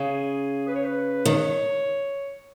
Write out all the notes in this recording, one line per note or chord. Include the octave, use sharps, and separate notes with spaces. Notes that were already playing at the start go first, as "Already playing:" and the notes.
Already playing: C#3 G#4
B4
C#5
B4
D#3 C#5